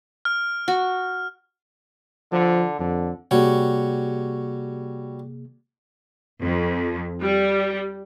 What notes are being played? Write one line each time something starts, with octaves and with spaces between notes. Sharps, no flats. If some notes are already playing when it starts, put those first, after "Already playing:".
F6
F#4
D3 F3
F2 D3
C3 G3 A#3 F#4 G#4 C#5
F2
G3